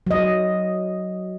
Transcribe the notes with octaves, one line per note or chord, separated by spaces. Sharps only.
F#3 D#5